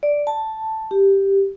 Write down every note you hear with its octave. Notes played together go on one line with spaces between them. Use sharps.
D5
A5
G4